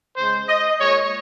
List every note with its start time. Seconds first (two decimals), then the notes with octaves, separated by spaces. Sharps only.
0.17 C#3 C5
0.22 G#3
0.49 D#5
0.80 A#2 G#3 C#5